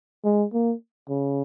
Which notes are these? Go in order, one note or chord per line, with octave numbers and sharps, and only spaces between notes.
G#3
A#3
C#3